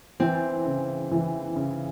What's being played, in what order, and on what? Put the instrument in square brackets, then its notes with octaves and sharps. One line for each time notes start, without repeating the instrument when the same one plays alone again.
[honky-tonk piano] E3 [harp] C4
[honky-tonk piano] C#3
E3
C#3